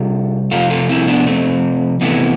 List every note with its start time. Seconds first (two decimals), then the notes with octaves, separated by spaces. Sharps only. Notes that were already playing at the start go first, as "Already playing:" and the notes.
Already playing: C3 G3 F4 A4
0.51 C3 F3 A3 F4 A4
0.70 F4 A4
0.89 C4 E4
1.07 B3 D4
1.27 A3 C4
2.01 C3 E3 A3 B3